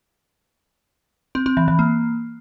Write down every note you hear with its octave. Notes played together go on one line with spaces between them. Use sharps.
C4
C4
E3
E3
A#3